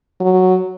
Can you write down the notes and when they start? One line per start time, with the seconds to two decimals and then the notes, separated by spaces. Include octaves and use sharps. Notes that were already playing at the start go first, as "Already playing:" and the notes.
0.20 F#3